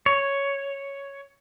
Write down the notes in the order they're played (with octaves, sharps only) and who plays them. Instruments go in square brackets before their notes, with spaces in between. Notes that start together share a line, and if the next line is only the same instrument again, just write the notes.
[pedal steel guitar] C#5